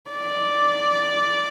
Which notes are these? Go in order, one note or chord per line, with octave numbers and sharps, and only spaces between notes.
D5